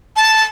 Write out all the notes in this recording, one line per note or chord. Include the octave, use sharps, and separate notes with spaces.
A5